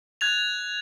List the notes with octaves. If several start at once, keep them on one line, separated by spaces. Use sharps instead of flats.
F#6 G#6 A6 F7